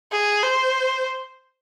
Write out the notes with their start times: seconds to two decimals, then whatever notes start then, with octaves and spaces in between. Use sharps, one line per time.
0.13 G#4
0.43 C5